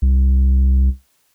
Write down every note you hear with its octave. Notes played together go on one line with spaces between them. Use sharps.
C2